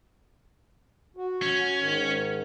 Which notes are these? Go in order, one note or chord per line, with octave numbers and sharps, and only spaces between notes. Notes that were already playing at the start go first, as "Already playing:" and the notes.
F#4
C#4
G#2 D#3